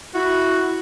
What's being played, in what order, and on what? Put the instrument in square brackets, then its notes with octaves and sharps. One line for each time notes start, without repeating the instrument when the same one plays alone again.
[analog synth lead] E4 [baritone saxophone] F#4